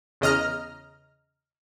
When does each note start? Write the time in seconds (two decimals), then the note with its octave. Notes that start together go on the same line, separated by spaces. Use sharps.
0.21 E2 C#3 D#5 A#5 F6